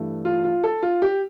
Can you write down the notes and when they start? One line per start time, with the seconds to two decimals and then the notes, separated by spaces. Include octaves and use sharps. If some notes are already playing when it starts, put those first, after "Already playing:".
Already playing: G2 E3 A3
0.25 F4
0.44 F4
0.64 A4
0.83 F4
1.02 G4